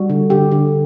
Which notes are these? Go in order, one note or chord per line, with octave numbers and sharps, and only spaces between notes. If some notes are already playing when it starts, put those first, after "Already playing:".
Already playing: G3 F#4
D3
D3 G4
D3